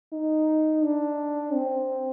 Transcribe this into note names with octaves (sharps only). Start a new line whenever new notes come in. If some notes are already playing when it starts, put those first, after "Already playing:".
D#4
D4
C4